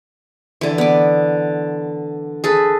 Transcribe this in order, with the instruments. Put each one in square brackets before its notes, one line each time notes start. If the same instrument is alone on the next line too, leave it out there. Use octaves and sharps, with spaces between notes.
[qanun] D3 E3
B3 D6
G#4 A4 B4